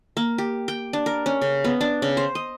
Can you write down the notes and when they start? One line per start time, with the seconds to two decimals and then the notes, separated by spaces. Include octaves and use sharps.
0.17 A#3
0.38 G4
0.68 G5
0.93 D4
1.06 A#4
1.26 C#4
1.42 C#3
1.64 B3
1.81 D4
2.02 C#3
2.17 C5
2.35 D#5